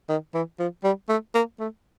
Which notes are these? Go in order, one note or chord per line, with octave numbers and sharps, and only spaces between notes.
D#3
E3
F3
G3
A3
A#3
A3